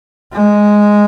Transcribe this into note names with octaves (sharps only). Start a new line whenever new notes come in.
G#3